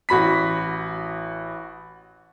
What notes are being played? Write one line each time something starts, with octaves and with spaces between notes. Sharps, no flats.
A1 F#4 B5 B6